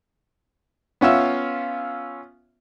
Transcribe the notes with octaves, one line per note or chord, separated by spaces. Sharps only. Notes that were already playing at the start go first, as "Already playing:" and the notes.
B3 C#4 F4 E5